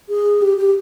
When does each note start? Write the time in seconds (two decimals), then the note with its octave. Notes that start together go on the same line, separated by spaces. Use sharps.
0.09 G#4
0.42 G4
0.58 G4